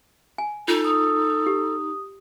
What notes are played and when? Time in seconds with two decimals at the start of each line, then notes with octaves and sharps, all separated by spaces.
0.38 G#5
0.68 D#4 F4 A4
0.84 D#6
1.46 G4